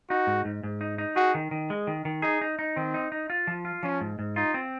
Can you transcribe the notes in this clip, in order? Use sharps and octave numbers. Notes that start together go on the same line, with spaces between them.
D#4 F#4
G#2
G#2
G#2
D#4
D#4
F#4 G#4
D#3
D#3
G#3
D#3
D#3
D#4 G#4
D#4
D#4
D#3 C4
D#4
D#4
F4
F3
F4
F3 C#4
G#2
G#2
D#4 F4
C4